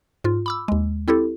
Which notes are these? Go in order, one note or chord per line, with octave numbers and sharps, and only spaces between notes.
G#2 F4
B5 D6 E6
D#2 G#3
C4 E4 G4 A4